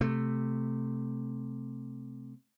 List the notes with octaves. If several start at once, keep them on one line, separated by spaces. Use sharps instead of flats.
C3 A3